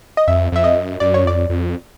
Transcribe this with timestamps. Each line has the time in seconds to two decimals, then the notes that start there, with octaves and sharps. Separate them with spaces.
0.17 D#5
0.28 F2 E5
0.52 F2 E5
0.64 D#5
0.76 F#2
1.00 F#2 D5
1.14 C#5
1.25 F2 D5
1.50 F2